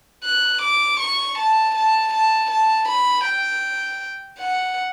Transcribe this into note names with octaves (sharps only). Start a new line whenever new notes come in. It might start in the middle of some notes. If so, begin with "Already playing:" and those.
F#6
D6
C#6
A5
A5
A5
A5
B5
G5
F#5